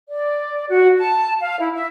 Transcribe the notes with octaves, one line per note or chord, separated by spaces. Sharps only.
D5
F#4
A5
F5
E4
E5